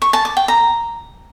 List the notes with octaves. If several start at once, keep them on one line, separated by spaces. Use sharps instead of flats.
C#6
A5
D6
G5
A#5